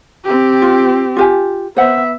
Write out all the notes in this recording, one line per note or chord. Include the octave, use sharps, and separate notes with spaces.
C4 G4
F4
F4 G4 G#5
B3 C5 E5 F#5